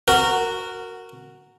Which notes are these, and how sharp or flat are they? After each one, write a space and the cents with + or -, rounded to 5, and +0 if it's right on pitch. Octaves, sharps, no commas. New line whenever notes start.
F#4 +0 A#4 -15